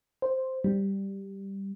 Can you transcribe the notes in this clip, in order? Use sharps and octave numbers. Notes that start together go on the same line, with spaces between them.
C5
G3